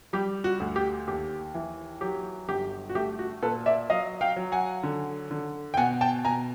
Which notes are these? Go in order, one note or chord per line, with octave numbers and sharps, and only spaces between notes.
G3 G4
F#4
D2
G4
D#2 G4
E3
F#3 G4
G1 G4
F#4
A3 G4
F#4
A#2 A4 B4
D5 E5
F#3 D#5 F5
F5 G5
F#3
F#5 G#5
D3
D3
G5
B2 F#5 G#5
G5 A5
B2 G#5 A#5